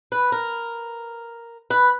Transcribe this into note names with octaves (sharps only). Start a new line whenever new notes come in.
B4
A#4
B4